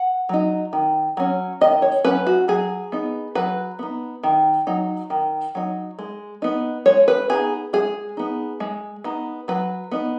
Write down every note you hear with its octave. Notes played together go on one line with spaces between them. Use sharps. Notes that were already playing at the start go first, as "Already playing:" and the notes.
Already playing: F#5
F#3 D#4
D#3
F#3 C#4
D#3 D#5
C#5
F#3 C#4 B4
F#4
F#3 G#4
B3 D#4
F#3 B4
B3 D#4
D#3
F#3 D#4
D#3
F#3 D#4
G#3
B3 D#4
G#3 C#5
B4
B3 D#4 G#4
G#3 G#4
B3 D#4
G#3
B3 D#4
F#3 B4
B3 D#4